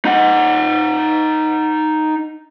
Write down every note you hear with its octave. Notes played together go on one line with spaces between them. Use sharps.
D#4 F#5